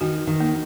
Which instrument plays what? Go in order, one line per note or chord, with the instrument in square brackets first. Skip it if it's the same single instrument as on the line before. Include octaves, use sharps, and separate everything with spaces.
[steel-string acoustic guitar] D#3 [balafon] F#4
[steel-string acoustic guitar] D#3
[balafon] A#3